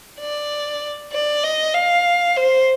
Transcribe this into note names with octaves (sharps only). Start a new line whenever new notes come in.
D5
D5
D#5
F5
C5